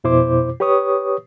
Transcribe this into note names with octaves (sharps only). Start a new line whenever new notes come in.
F2 B2 E4 C5 D6
G4 B4 C#5 C#6 D#6